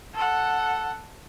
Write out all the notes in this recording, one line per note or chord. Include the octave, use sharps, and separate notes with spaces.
A4 F#5